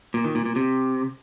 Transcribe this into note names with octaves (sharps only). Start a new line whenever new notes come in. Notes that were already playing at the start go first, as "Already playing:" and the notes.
A#2
D#3
A#2
A#2
C3